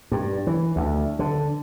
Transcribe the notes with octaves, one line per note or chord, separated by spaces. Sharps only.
G2
E3
D2
D3